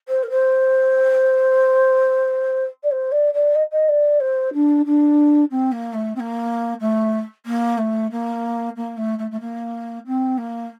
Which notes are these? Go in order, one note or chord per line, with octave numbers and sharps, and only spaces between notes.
C5
A#4
C5
D5
C5
D5
D5
D#5
D#5
D5
C5
D4
D4
C4
A#3
A3
C4
A#3
A3
A#3
A3
A#3
A#3
A3
A3
A3
A#3
C4
A#3